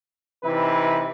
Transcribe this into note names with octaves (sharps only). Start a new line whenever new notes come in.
C3 E3 D#4 E4 B4